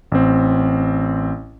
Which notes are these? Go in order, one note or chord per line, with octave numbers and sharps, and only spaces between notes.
A1 C4